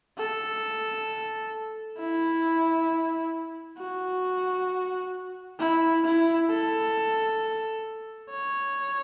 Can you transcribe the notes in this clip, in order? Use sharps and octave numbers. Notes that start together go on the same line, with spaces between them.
A4
E4
F#4
E4
E4
A4
C#5